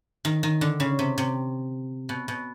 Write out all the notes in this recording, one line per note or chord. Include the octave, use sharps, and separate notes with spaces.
D#3
D#3
D3
C#3
C3
C3
B2
B2